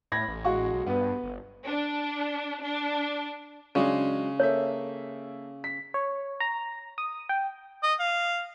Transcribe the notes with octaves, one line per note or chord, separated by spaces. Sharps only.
A2 B5 G#6 A#6
A1
G#3 F#4 C#6
B1
G2 B3 B4
G1
D4
D4
C#3 F#3 G#3 D4
A#3 A4 C#5 E5
B6
C#5
A#5
D#6
G5
D#5
F5